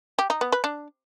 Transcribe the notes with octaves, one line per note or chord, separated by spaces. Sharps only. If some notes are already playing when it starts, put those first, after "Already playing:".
G4
D#4
B3
B4
D4